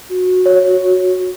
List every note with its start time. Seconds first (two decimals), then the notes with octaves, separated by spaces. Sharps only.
0.10 F#4
0.46 C#5